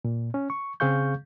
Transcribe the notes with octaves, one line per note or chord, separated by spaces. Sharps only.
A#2
C#4
C#6
C#3 C4 G#4 F5 C#6 G6